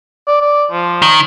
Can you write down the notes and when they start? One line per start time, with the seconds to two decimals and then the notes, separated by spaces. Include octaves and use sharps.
0.27 D5
0.41 D5
0.72 F3
1.02 D#3